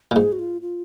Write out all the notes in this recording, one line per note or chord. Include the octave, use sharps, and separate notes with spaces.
A#2
G#2 G#4
F#4
F4
F4